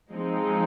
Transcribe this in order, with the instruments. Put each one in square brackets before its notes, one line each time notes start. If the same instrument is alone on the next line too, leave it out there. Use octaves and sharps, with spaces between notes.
[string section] F3 G#3 C4 D#4